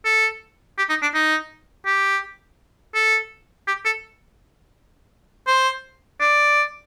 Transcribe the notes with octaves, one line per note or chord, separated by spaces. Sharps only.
A4
G4
D#4
D4
D#4
G4
A4
G4
A4
C5
D5